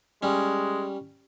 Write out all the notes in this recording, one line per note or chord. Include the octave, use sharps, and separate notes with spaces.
G3 G#3 C#4